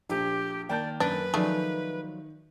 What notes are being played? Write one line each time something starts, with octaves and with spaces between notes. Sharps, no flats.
A#1 A3 G4
D#3 A#3 D5 G5 A5 G6
F#2 D4 B4
D#3 F3 F#3 A3 G#4 D5